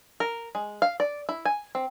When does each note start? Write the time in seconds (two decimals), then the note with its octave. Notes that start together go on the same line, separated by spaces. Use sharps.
0.20 A#4
0.55 G#3
0.82 F5
1.00 D5
1.29 E4
1.45 G#5
1.75 C4